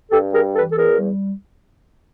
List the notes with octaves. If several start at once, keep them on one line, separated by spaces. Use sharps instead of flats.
G2 G4 A4
G3 G#4 A#4
E3 A4 B4
A4
E2 G#4 A#4
G3